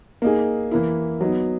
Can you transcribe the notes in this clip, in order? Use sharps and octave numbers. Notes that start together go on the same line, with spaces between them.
A#3 D#4 G#4
E3 A#3 E4
F#3 B3 D#4